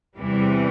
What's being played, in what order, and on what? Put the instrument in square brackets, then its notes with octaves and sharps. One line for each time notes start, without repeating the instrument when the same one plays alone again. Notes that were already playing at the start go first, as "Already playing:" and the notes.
[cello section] E2 C3 E3 G3